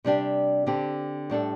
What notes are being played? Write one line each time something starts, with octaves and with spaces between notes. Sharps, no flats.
C3 G3 D4 G4
D3 C4 G4
A2 G3 D4 A4